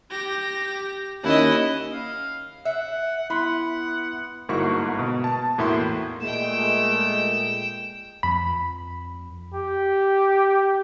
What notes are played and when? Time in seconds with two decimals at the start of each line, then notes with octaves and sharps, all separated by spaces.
0.10 G4 A#6
1.24 D#2 C#4 E4 D#5 F#5
1.92 F5
2.65 E5 F#5
3.30 B3 E4 F#5 B5 C6
4.49 G1 G#2 A#3 E4 F#4 C#6
4.99 B2
5.24 A5
5.58 E2 A2 A#3 E4 F#4 C6
6.21 A#2 G#3 A3 G5 E7
8.23 F2 B5
9.55 G4